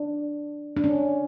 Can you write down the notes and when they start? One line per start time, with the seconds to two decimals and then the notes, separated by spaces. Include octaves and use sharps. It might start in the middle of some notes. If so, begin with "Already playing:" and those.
Already playing: D4
0.77 D4
0.84 C#4